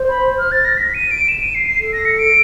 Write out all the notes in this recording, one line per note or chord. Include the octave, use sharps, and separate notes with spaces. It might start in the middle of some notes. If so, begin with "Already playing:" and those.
Already playing: C5
B5
F6
A6
A#6
B6
D#7
D7
E7
D#7
C7
C7
A4
A#6
C#7
D7